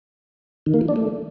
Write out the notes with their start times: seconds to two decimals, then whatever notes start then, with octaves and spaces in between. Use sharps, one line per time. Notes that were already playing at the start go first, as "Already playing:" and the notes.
0.66 D#3
0.74 A#3
0.81 E3
0.88 D4
0.96 A3